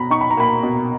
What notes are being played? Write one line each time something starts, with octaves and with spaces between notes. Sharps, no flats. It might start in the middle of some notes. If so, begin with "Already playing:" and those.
Already playing: B2 A#5 B5
D#4 C#6
B5
A#5
A#3 B5
B2